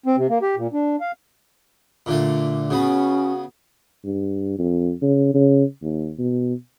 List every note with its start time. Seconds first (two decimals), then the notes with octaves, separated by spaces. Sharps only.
0.06 C4
0.17 C3
0.29 A#3
0.42 G4
0.57 A#2
0.73 D4
1.00 F5
2.06 A#2 D3 A3
2.70 C#3 B3 C#4 F#4
4.05 G2
4.58 F2
5.02 C#3
5.34 C#3
5.82 D#2
6.18 B2